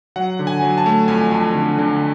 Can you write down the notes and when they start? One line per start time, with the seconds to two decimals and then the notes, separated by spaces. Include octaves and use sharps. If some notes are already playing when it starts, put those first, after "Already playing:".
0.16 F#3 F#5
0.39 D3
0.47 G#5
0.62 F#3
0.78 A5
0.86 A3
1.08 F2 G#5
1.32 F2
1.54 D3
1.78 D3